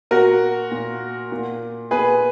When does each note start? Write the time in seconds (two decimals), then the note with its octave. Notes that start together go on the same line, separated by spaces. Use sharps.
0.11 A#2 F#4 A#4
0.72 A#2
1.32 A#2
1.91 A#2 G#4 B4